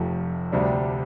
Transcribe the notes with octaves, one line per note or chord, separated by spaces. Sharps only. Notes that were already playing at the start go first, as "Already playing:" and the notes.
Already playing: F1 F2 C3 F3 A3
D2 C3 G3 D4